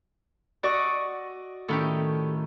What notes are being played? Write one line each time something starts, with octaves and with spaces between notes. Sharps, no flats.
F#4 D5 D#5 C#6 E6
A2 D#3 A3 C#4 G4